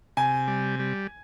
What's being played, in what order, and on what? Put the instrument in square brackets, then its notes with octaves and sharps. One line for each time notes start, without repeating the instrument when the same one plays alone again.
[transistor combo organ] C3 [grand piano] G#5
[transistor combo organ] G3
G3